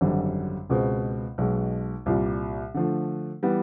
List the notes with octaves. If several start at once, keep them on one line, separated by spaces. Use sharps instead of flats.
G#1 F#2 D3 G3
C#2 B2 G#3 C4
B1 B2 G#3
C2 A#2 G3
D3 F3 A3
E3 G3 B3